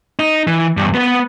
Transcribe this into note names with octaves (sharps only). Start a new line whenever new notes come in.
D#4
E3
E2 G2
B3 B4